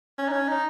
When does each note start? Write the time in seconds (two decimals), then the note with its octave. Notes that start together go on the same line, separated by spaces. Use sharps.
0.18 C#4
0.28 D#4
0.32 C#4
0.48 D#4